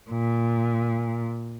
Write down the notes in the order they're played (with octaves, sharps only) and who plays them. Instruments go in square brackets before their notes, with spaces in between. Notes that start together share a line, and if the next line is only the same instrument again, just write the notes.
[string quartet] A#2